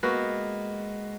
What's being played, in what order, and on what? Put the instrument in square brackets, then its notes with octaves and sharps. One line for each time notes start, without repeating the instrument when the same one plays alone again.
[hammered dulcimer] G#3 [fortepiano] A#3 B3 F#4